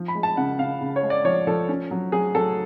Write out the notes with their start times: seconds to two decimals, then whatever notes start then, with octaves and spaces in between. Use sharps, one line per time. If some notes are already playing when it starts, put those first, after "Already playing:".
Already playing: F3
0.08 B5
0.15 G#3
0.23 A5
0.37 C#3 F#5
0.59 C#3 F5
0.81 C#3
0.96 C#5
1.03 G#3
1.10 D5
1.25 F3 C#5
1.47 F3 A4
1.69 C#4
1.91 F#3
2.12 F#3 G#4
2.35 F#3 A4